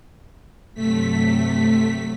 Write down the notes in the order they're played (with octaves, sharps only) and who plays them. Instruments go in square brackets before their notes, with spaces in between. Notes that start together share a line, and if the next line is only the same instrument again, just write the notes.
[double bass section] G2 C3 F#3 [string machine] A3 B6